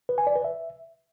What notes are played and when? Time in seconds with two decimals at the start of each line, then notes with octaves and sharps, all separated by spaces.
0.09 B4
0.18 G#5
0.27 D5
0.36 B4
0.44 E5